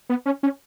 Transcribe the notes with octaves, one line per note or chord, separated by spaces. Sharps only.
B3
C#4
C#4